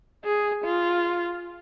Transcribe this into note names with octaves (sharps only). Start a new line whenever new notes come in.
G#4
F4